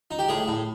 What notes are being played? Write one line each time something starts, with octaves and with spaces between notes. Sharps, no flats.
D#4
G4
A2 G#4
A2